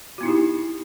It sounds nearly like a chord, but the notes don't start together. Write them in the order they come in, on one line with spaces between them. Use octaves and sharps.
F#4 B3 E4 D#4 G4